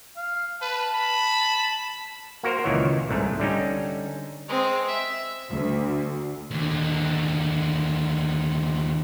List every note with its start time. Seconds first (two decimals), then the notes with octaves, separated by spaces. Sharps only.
0.17 F5
0.61 B4 A5
0.94 B5
2.43 A#3 F#4 A#4 C5
2.64 C#2 A#2 D#3 E3 C#5
3.09 C2 G#2 A3
3.40 D3 G3 C#4 D#4
4.48 G#3 C4
4.87 E5
5.52 D2
6.51 D#2 D3